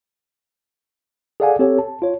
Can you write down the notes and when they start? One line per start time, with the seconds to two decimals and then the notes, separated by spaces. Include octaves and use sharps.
1.40 G#4 A4 D5 F5 F#5 G#5
1.59 C4 G4 A4 C#5
1.79 A5
2.02 F4 C#5